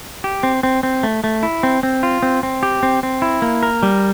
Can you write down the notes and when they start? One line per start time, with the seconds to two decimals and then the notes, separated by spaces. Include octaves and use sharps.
0.24 G4
0.43 C4
0.63 C4
0.83 C4
1.03 A3
1.24 A3
1.43 E4
1.63 C4
1.83 C4
2.03 F4
2.23 C4
2.43 C4
2.63 G4
2.83 C4
3.03 C4
3.22 E4
3.42 A#3
3.63 A#4
3.83 G3